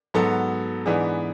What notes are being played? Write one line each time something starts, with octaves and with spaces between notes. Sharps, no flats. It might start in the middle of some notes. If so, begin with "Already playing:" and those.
G#2 F#3 B3 F#4 A4
G#2 E3 B3 D4 G#4